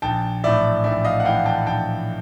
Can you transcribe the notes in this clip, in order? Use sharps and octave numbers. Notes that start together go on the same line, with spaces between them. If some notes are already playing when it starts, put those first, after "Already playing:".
A#1 G5 A5
A2 E3 D5 E5
A#1 D5 E5
D#5 F5
F#5
A2 E3 F5 G5
G5 A5
A#1 G5 A5